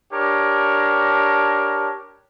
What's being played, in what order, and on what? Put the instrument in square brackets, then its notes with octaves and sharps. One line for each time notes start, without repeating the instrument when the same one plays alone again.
[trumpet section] D4 G4 A#4 C#5 A5